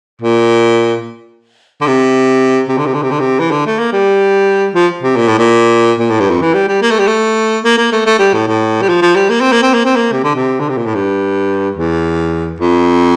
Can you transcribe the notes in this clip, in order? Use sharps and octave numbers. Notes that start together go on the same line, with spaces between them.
A#2
D3
C3
C3
D3
C3
D3
C3
D3
C3
E3
D3
A3
A#3
G3
F3
C3
A#2
A2
A#2
A#2
A2
G2
F2
E3
G3
G3
A#3
A3
G3
A3
A#3
A#3
A3
A3
G3
A2
A2
G3
F3
F3
G3
A#3
C4
A#3
C4
A#3
C4
A#3
C3
D3
C3
D3
C3
A#2
A2
G2
E2
F2